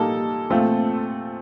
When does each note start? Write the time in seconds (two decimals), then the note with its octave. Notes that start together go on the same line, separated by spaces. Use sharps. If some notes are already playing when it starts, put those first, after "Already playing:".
Already playing: A#2 G3 A#3 D#4 A4
0.50 A#2 A3 C4 F4